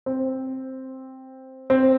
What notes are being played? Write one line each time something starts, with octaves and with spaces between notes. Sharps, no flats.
C4
C4